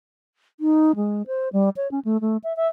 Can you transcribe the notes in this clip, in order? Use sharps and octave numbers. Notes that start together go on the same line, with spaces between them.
D#4
G#3
C5
G3
C#5
C#4
A3
A3
E5
E5